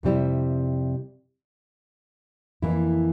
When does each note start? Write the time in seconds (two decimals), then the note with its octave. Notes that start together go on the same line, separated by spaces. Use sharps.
0.03 F2 C3 G3 C4 E4
2.62 F2 E3 A#3 E4